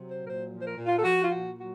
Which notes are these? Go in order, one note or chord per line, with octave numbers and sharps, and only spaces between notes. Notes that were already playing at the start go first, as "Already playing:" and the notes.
Already playing: C3 F#3
C5
A#2
A#4
C5
F3
C5
A#4
A#2
F4
A4
F3 F#4
F4
A#2 F#4
F#3 F#4